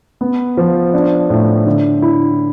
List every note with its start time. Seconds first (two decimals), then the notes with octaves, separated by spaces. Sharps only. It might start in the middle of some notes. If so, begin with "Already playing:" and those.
0.21 B3
0.57 F3
0.94 D4
1.30 A2
1.66 D3
2.02 E4